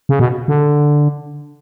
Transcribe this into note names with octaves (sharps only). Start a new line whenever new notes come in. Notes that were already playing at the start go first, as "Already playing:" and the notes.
C#3
B2
D3